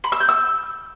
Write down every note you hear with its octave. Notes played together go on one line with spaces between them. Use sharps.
B5
E6
G6
E6